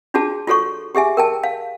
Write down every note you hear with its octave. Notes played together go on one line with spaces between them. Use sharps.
D4 F4 F#4 G#4 A5
F4 F#4 A4 C#5 C#6
G4 G#4 E5 G#5
A#4 G5 A5
F5